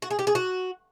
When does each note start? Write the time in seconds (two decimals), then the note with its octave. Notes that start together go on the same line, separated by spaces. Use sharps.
0.02 F#4
0.11 G#4
0.19 G4
0.27 G#4
0.35 F#4